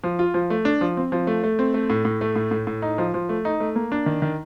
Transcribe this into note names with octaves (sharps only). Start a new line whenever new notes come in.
F3
F4
F3
A3
D4
F3
C4
F3
A3
A3
C4
A3
A2
A2
A3
A2
A2
A2
D#4
F3
F3
A3
D#4
A3
A#3
D4
D#3
D#3